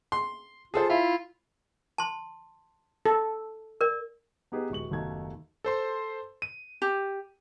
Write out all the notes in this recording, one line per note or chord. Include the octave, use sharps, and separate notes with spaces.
C6
F4 G#4 A4 C5
E4 F4 E5
A5 C6
A4
A#4 D5
B3 D#4 G4 G#4 B4
D1 G#3 C#6 F#7
F#1 D#2 B2 A3 D#4 G#6
A4 C5 C6
D#7
G4